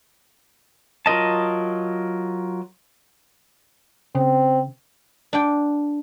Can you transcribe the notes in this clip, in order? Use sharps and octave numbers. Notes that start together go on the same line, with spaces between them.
F#3 F4 A#4 D#5 A5
C#3 C4
D4 G5